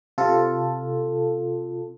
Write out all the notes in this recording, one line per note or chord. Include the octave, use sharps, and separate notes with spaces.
C3 F4 A4